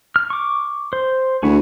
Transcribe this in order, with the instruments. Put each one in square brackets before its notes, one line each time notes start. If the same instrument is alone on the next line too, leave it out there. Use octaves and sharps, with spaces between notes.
[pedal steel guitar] F6
C#6 D6
C5
[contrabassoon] D2 [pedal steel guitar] E4 F#4 G#4